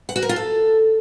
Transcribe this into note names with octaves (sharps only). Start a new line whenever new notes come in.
F#5
F#4
A#4
F4
A4